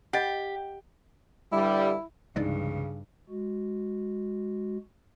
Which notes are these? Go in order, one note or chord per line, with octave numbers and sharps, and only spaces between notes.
G4 D#5 F#5
G2 D3 G3 E4
C2 G2 C#3 E3 G#3 D4 D#4
G#3 F#4